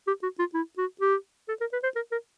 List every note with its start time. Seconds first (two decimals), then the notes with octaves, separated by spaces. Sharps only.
0.07 G4
0.23 F#4
0.39 F4
0.54 E4
0.78 F#4
1.01 G4
1.49 A4
1.61 A#4
1.73 B4
1.83 C5
1.96 A#4
2.12 A#4